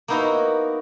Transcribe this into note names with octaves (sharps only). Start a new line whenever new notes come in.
A#3 B3 D#4 E4 F#4 B4